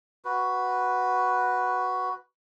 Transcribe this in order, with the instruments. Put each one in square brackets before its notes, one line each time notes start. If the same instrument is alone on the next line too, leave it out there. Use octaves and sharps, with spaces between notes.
[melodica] F#4 B4